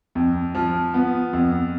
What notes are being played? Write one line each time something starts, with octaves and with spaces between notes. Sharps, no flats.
F2
F3
B3
F2